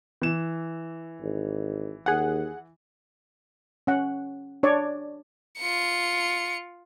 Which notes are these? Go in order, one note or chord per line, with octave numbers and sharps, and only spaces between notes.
E3 E7
G#1
D#2 G#4 F#5
C#4 F#5
D4 C#5 D5
F4 C#7